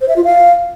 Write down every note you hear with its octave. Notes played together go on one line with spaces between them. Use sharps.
C5
E5
F4
F5